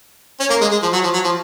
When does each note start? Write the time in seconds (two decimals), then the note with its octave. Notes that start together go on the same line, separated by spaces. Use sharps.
0.40 C#4
0.50 A#3
0.61 G#3
0.71 G#3
0.82 F3
0.93 F#3
1.03 F3
1.13 F#3
1.24 F3